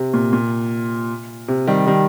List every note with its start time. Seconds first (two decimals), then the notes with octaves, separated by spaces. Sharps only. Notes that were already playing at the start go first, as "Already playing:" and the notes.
Already playing: C3
0.14 A#2
0.33 A#2
1.48 C3
1.67 D#3 G3
1.87 D#3 G3